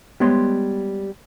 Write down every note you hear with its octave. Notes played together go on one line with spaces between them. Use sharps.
G3 G#3 B3 C#5 C6